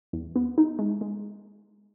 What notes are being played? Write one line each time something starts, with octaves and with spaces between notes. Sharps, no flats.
E2
B3
D#4
G#3
G#3